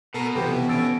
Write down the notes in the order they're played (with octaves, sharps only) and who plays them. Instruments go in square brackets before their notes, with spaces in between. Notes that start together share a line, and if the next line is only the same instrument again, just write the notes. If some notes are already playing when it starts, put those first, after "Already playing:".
[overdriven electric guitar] B2 [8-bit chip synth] A4 A#4 A#5
[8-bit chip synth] C3 E3 F3 [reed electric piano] B3 G4 C5 [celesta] A4
[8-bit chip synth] E3 C#4 [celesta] E6 A6 D7